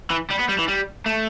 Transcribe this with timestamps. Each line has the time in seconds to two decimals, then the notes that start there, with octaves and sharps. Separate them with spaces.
0.10 E3
0.30 G3
0.39 B3
0.49 G3
0.58 E3
0.68 G3
1.06 A3